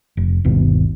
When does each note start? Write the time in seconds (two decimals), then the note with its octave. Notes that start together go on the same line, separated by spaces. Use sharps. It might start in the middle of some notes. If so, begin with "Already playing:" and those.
0.17 F1
0.45 G1 D#2 B2